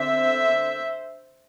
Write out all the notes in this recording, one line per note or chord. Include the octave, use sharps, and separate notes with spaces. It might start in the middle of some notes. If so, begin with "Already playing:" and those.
Already playing: D3 C4 C5 E5